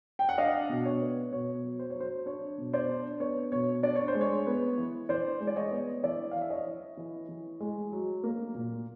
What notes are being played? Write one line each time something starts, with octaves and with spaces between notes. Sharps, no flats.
G5
F#5
D4 D#5 F5
B2
C#5
B3
B2 C#5
F#3
C5
F#3 C#5
C5
D4 C#5
B2
C5 D5
D4
B3 C#5
B2 C#5
D4 D5
C#5
C5
G#3
C#5
B3
E3
E3 C5 D5
G#3
D5
C#5 D#5
B3
E3 D5 E5
E3 F5
E5
C#5 D#5
E3
E3
E3
G#3
F#3
A#3
A#2